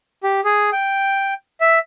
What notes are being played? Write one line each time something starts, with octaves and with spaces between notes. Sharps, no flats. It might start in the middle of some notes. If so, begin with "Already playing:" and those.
G4
G#4
G5
E5